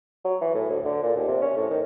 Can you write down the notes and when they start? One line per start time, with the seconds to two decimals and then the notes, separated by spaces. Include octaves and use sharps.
0.25 F#3
0.41 E3
0.55 A2
0.70 D2
0.85 D3
1.03 A#2
1.16 D#2
1.28 C3
1.42 C#4
1.57 A2
1.71 D#3